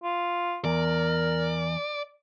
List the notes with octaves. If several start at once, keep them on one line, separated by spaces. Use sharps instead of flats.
F4
E2 A#4 D5